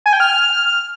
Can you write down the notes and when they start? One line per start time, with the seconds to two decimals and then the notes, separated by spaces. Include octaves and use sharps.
0.06 G#5
0.13 G5
0.20 F6